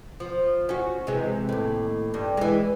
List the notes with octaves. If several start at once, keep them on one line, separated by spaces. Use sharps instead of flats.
F3
C#4 F#4
C3 E3 G#3
D#2 A2
G2
E3 G#3